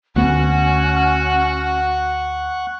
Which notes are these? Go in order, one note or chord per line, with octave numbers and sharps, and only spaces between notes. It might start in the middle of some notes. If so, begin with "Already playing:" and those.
D2 A3 B3 C#4 F#4 F#5 C#6 F#6